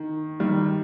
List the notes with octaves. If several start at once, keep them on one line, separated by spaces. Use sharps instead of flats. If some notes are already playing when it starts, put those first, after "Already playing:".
Already playing: D#3
D#3 G3